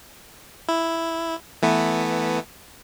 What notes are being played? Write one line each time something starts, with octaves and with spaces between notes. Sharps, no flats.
E4
E3 A3 B3